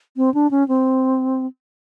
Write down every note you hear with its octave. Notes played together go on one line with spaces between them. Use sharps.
C4
D4
C#4
C4